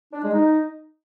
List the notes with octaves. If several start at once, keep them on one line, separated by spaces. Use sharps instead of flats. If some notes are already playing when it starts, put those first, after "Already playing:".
D4
G#3
D#4